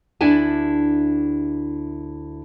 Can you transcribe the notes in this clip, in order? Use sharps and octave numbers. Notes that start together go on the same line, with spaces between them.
D2 D4 E4 G#5 A5